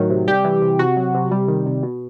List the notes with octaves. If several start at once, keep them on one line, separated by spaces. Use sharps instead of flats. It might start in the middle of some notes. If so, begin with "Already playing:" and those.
Already playing: A2 D#3 F#3
C3
G3 G4
E3
C3
C3 F#4
F#3
C3
G3
D#3
C3
B2